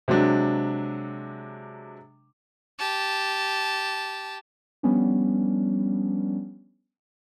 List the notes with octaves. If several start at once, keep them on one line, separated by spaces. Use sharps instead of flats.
C3 F#3 G#3 D4
G4 A5
F3 G3 B3 C#4 D4